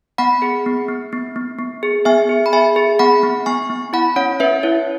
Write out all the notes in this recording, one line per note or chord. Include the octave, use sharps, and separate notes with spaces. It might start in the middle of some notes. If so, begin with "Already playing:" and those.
B3 F#5 B5
G#4
B3
B3
B3
B3
B3
G#4
B3 E5 G#5
G#4
B5
G#4 E5 G#5
G#4
B3 F#5 B5
B3
B3 G#5 C#6
B3
E4 F#5 B5
C#4 C#5 F#5
C#4 B4 E5
E4 C#5